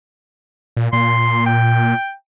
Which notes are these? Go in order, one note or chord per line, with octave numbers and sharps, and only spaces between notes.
A#2
A#2 C6
G5